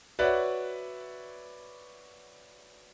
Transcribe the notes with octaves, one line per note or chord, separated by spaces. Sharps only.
F#4 B4 C#5 D5 E5 F#5